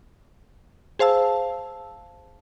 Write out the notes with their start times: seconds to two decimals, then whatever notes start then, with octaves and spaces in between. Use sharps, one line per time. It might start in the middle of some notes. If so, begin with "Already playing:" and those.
0.99 G#4 C5 F5 A5 E6